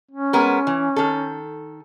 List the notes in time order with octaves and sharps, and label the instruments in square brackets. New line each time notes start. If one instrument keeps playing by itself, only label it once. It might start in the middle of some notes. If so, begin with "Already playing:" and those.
[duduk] C#4
[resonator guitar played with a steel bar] G#3 B3 A#4
E3
D#3 A4